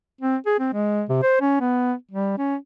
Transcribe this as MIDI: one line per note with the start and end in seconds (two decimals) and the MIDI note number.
0.21 0.36 60
0.46 0.54 68
0.59 0.73 60
0.73 1.03 56
1.09 1.18 48
1.23 1.39 72
1.41 1.60 61
1.60 1.93 59
2.11 2.34 55
2.38 2.56 61